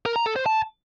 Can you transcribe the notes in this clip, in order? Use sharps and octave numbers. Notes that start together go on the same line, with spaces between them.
A#4
A#5
A4
C5
A5